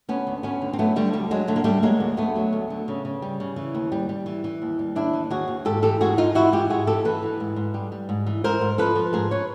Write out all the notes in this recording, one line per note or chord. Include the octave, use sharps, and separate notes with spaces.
D2 B3 C#4
D2
D2 B3 C#4
D3
C4
F#3 A3 B3
D3 G3 A3
D2 G3
F#3 G#3
D3 A3
A#3
D2 G3 A3
F#3 G#3 A#3
D2
D2 A3 B3
F#3
D2
D3
C#3
C#3
G3
C#3
E3
D#2
G3
G3
E3
E3
D#2
G3
D#2 D4 E4
E3
D#2 F#4 G#4
D#2
G#2 G4 A4
E3 G4 A4
G#2 F#4 G#4
G#2 D#4 F4
E3 E4 F#4
G#2 F4 G4
G#2 F#4 G#4
E3 G4 A4
E3 A4 B4
E3
G#2
G#2
G3
G3
G#2
E3
G#2 A#4 C5
G#2
F3 A4 B4
F3
G#2 G#4 A#4
B4 C#5